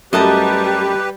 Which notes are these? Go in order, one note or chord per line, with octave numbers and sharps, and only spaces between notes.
F#2 G3 A3 G4 B4 D#5 A5 A#5